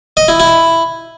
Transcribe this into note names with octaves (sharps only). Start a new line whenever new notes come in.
D#5
E4
E4